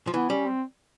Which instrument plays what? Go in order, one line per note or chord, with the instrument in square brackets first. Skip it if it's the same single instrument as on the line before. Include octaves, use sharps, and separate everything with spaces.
[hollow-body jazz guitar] F3
[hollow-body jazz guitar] E3 [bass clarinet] B3
[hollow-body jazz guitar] G3 [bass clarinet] C#4
[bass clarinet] C4